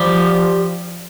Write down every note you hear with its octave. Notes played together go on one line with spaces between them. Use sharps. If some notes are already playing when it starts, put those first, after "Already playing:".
Already playing: F3 G3